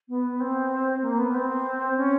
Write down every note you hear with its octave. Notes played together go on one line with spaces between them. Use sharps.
B3
C4
A#3
B3
C4
C#4